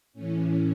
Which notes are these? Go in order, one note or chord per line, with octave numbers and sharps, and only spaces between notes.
A2 E3 C#4